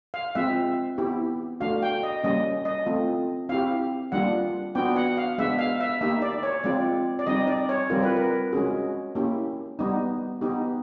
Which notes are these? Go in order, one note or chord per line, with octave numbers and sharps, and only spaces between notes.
F5
G#3 C4 F4 E5
B3 E4 G4
A3 D4 F#4 F5
G5
D#5
G3 A#3 C#4 D#5
D#5
A3 C4 F4
C4 E4 G4 F5
G3 A#3 D4 F4 F#5
B3 D4 F#4 G5
F#5
F5
G#3 B3 D4 E5
F5
E5
A#3 D#4 G4 E5
D5
C#5
G#3 C4 F4 D5
D5
G3 C4 D#4 D#5
D5
C#5
G3 C4 F4 A#4
B4
A#4
G#3 C#4 F#4 G#4
A#3 C#4 E4 G4
G3 B3 D#4
B3 D#4 G4